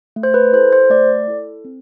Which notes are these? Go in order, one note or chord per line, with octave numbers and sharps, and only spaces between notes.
A3
C5
B4
E4 A4 C5
C5
A3 D5
E4 A4
C4